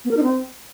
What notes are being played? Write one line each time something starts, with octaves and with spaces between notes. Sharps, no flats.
B3
A#4
D#4
C4